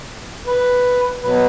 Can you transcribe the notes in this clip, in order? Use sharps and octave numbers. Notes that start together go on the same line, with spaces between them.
B4
B2 F#3 B4